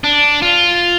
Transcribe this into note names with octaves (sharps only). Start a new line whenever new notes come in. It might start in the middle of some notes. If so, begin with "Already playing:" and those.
D4
F4